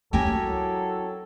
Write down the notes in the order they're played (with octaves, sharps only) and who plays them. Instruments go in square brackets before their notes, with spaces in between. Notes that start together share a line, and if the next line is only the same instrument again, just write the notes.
[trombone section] F#3 [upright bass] C#4 E4 [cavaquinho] G4 A#4 G#5 [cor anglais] A4